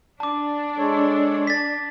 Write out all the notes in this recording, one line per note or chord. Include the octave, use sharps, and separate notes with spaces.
D4 A5 D6
G#3 A4 C#5
A6 B6